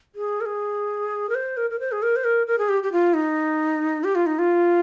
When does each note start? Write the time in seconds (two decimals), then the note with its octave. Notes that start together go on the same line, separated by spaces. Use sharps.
0.15 G#4
0.41 A#4
0.46 G#4
1.29 A#4
1.35 C5
1.57 A#4
1.70 A#4
1.80 C5
1.92 G#4
2.03 A#4
2.16 C5
2.24 A#4
2.47 A#4
2.58 G#4
2.69 G4
2.83 G4
2.92 F4
3.14 D#4
4.04 G4
4.15 F4
4.26 D#4
4.39 F4